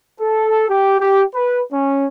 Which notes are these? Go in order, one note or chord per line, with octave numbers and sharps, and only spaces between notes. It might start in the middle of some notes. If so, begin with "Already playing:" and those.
A4
G4
G4
B4
C#4